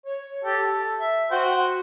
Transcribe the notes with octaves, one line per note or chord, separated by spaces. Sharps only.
C#5
G4 A4
A4
E5
F#4 C5 G5